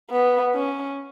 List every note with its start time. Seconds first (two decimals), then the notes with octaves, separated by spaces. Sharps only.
0.11 B3
0.54 C#4